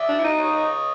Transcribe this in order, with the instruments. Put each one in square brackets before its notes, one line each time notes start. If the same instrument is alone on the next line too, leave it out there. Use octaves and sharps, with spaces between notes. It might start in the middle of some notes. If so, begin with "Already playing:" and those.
Already playing: [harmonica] D5 E5
[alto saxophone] D4
E4
D#4
[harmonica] C#5 D#5